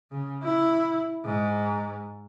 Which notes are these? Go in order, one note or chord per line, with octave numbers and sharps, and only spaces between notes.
C#3
E4
G#2